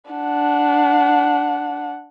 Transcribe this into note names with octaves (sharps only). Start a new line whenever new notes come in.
D4 F#5